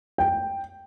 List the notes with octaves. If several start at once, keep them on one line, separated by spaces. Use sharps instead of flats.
G5